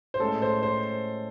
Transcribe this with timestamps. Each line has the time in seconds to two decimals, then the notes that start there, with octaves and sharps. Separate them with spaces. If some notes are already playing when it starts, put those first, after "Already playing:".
0.14 C5
0.19 A2 G#3 C#4 A4
0.42 C5
0.63 C5